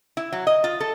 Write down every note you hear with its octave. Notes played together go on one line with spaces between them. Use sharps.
E4
F#3
D#5
F4
A4